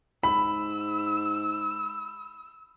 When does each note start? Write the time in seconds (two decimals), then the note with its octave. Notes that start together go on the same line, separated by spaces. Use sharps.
0.23 G#2 B5 E6